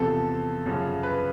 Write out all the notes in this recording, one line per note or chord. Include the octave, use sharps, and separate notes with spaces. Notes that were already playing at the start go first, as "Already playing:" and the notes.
Already playing: E2 C3 F3 A4
F#2 C#3 F3
B4